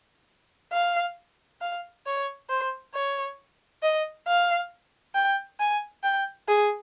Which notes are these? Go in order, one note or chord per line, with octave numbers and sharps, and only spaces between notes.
F5
F5
C#5
C5
C#5
D#5
F5
G5
G#5
G5
G#4